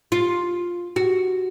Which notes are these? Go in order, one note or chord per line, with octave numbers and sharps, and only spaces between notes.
F4
F#4